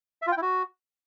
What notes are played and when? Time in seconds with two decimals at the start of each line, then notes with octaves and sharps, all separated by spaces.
0.22 E5
0.27 F4
0.32 G5
0.37 E4
0.42 F#4